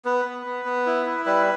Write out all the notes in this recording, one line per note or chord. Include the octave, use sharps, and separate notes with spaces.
B3 B4
B3
B3
B3
E4
E4
G3 B4